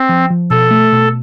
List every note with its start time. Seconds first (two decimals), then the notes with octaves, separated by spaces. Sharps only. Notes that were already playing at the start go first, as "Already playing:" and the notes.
Already playing: C4
0.09 F3
0.30 F3
0.50 B2 A4
0.71 A3
0.93 B2